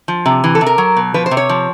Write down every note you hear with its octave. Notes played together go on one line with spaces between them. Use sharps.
F3
C3
E3
A4
C3
A#4
F#3
B2
F3 B4
C5
C3
C#5
F3